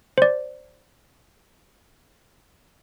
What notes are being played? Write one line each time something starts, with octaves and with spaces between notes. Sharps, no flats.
C5 D5